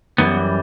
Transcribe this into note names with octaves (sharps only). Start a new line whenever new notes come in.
F#2 E3 G3 B3